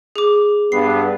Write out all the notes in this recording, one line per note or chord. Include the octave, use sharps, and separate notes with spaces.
G#4 D6
G2 B3 C7